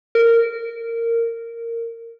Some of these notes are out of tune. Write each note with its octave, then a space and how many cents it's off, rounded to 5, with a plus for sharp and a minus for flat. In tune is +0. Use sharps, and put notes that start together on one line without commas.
A#4 -15